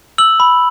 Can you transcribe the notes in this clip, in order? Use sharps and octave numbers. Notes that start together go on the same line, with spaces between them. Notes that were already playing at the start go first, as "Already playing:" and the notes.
E6 F#7
B5